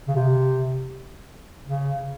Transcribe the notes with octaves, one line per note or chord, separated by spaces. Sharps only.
C#3
C3
C#3